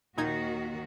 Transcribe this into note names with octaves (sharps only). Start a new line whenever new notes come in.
D#2 A#2 D#3 D#4 F#4 G#6